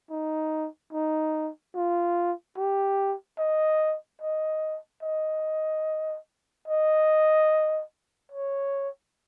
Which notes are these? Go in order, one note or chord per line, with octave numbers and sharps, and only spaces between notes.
D#4
D#4
F4
G4
D#5
D#5
D#5
D#5
C#5